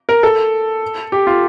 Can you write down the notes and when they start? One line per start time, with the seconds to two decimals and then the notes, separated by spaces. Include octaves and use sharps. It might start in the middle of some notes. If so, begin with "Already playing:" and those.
0.09 A#4
0.23 A4
1.12 G4
1.27 F4